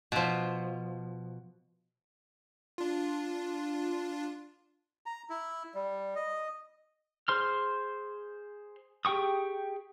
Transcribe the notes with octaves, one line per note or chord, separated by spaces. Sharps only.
B2 F3
D4 F4
A#5
E4
G3
D#5
G#4 C5 C6 F6
G4 G#4 G5 C#6 D#6